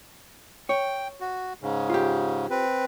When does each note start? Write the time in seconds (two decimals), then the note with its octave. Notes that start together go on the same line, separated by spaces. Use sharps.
0.69 C#5 G5
1.20 F#4
1.62 G#2 C#3
1.90 F4 G4
2.50 C4 B4